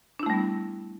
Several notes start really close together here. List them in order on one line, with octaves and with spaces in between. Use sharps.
D4 E4 A3 G3 B3